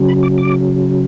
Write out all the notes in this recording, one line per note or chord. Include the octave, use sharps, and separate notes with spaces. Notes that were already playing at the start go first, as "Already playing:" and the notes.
Already playing: C#3 F#3
B5
D6
D6